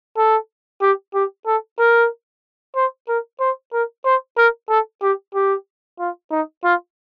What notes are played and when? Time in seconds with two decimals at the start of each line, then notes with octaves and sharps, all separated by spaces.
0.17 A4
0.82 G4
1.14 G4
1.46 A4
1.79 A#4
2.76 C5
3.08 A#4
3.41 C5
3.73 A#4
4.05 C5
4.38 A#4
4.69 A4
5.02 G4
5.35 G4
5.99 F4
6.31 D#4
6.64 F4